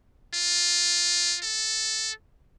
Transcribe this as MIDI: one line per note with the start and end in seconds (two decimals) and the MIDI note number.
0.34 1.37 65
1.43 2.11 69